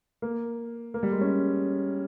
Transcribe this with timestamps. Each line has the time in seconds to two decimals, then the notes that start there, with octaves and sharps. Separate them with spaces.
0.22 A#3
0.94 A#3
1.03 G3
1.12 G#3
1.21 C#4